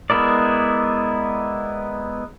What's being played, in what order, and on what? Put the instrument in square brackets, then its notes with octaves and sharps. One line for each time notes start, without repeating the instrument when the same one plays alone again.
[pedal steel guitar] G#3 B3 E4 A#4 D5